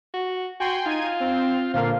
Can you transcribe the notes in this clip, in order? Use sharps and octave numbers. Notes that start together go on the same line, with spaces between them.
F#4
F#4 G5 G#5 C6
D#4 F4 G#6 D#7
C4
A#2 D3 A#3 F4 C5 F5